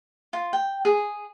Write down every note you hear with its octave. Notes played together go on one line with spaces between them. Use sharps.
F4
G5
G#4